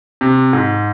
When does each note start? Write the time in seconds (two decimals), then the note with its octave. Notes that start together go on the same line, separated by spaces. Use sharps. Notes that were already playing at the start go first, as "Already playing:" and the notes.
0.21 C3
0.53 G#2